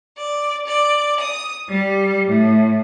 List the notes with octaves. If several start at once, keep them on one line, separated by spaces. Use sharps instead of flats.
D5
D5
D#6
G3
A2